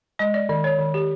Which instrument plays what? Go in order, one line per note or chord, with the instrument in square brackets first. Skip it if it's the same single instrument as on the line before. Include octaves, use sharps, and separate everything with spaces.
[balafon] G#3 D#5
D5
D#3 D5
C#5
D#3
G4